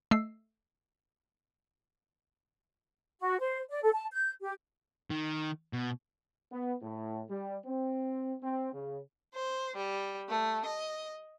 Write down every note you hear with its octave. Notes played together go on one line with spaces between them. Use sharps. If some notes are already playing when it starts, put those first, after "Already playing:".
A3 D#5 E6 C7
F#4
C5
D5
A4
A5
G6
G4
D#3
B2
B3
A2
G3
C4
C4
C#3
C5
G3
A3
D#5